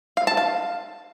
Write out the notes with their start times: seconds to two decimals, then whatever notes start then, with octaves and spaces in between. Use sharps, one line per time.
0.17 F5
0.27 A5
0.37 F5